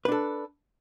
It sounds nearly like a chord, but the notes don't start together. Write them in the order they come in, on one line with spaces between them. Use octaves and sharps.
B4 D4 A4